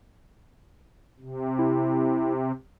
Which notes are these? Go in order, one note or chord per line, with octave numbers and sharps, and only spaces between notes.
C3
E4